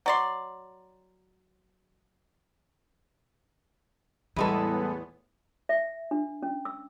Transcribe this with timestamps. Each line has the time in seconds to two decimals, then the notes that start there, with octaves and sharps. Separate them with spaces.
0.06 F#3 D5 C6
4.36 E2 A2 E3 G3 G#3 B3 A4
5.69 E5
6.11 D4
6.43 C#4
6.65 E6